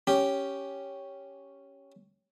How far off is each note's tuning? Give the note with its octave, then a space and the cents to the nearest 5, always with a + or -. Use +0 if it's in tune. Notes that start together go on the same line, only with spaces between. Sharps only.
C#4 +0 G4 +0